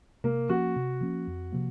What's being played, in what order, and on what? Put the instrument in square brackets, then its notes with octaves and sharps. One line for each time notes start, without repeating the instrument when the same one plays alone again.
[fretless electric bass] C3 [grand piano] A#3
[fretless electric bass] F3 A#3 C#4 [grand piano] F#4
[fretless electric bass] C3
F3 A#3 C#4
F2
C3 F3 A#3